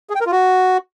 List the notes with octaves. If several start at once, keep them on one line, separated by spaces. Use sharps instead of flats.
G#4
G5
A#4
F4
F#4